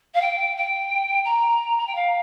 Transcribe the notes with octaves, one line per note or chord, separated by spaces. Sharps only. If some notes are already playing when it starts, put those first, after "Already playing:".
F5
G5
G5
A#5
A#5
G5
F5